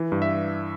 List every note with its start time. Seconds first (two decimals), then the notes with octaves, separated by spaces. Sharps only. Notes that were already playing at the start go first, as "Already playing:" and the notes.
Already playing: E3
0.12 G2
0.22 E5